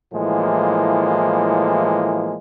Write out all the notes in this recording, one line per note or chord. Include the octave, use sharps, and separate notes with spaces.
A2 E3 F3 G#3 A#3